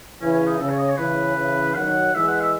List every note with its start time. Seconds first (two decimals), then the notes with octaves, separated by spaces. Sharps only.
0.21 C#3 E3 C#4
0.33 C#4
0.47 D#4
0.60 C#3 A4
0.69 C#5
0.78 D#5
0.89 C#5
0.98 C#3 E3 B4
1.36 C#3 E3
1.75 D#3 F#3 F#5
2.14 E3 G#3 E5
2.28 F#5
2.41 E5